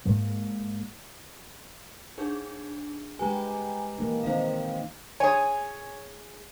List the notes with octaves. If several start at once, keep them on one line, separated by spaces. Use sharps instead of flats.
G#2 G#3 A#3
D4 D#4 G#4
G#3 G4 B4 G#5 A#5
E3 A#3 D#4
D#3 C4 D#4 C5 F5
G#4 C#5 G#5